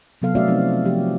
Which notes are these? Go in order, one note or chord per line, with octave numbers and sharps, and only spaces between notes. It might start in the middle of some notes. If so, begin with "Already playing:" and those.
C3 F#3 B3 A4 F5
A3 C#4 F#4 D5 E5 F5
F3 A3 C4 D#4
F3 A3 G4